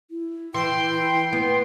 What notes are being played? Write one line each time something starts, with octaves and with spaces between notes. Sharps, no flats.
E4
E3 G5 C6
B3